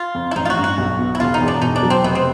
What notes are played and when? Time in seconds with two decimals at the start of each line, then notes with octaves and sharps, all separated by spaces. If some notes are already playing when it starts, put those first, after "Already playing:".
Already playing: F4
0.15 F2
0.31 E4
0.36 A1 D#4
0.45 F4
0.50 F#4
0.57 G2
0.64 F#4
0.78 B1
0.99 B2
1.15 E4
1.20 E1 F4
1.34 D#4
1.41 E2
1.48 D4
1.62 B2 D#4
1.76 D4
1.83 F#3
1.90 C4
2.04 F1 B3
2.15 C4